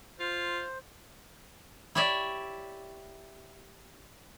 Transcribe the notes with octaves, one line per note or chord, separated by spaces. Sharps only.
F4 C5
E4 G4 C#5 D5 E5